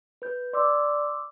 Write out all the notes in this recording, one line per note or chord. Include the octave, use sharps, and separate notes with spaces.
B4 G6
D5 C6 D6 E6